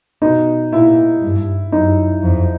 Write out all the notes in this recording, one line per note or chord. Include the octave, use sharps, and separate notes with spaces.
B2 D#4
A#2 E4
G2
F#2 D#4
F2